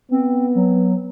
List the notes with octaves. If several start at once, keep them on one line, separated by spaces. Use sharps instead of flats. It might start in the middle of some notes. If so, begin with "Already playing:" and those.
B3 C4
F#3